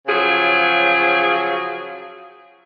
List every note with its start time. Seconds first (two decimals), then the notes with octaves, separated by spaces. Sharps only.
0.07 C#3 F3 F#3 G#4